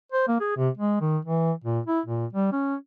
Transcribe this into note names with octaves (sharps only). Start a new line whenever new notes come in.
C5
A#3
G#4
C3
G#3
D#3
E3
A#2
E4
A#2
G3
C#4